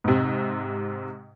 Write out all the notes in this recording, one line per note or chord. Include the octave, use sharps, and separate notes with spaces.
G#2 C3